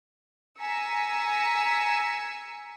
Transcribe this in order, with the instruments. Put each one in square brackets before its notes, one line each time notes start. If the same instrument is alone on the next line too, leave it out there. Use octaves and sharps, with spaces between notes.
[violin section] G#5 A#5 E6 B6 C#7